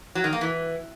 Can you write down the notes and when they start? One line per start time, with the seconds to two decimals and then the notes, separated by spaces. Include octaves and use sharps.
0.15 F#3
0.24 D#3
0.33 A#3
0.41 E3